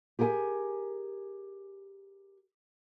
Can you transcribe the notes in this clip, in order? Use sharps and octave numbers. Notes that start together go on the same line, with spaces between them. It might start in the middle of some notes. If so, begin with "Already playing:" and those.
G4 G#4 A#4 G5 G#5